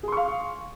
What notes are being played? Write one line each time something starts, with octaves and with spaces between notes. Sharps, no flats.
G#4 F5 C6 C#6